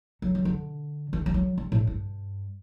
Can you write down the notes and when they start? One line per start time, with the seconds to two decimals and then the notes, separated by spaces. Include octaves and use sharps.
0.22 F#3
0.35 D#3
0.45 D3
1.13 D#3
1.26 G3
1.34 F#3
1.58 G3
1.72 A2
1.87 G2